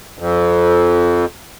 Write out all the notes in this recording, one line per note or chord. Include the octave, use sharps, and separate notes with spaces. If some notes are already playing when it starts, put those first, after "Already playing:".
F2